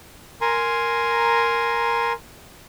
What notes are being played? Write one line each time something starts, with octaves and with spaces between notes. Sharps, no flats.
A#4 G#5 A#5 C6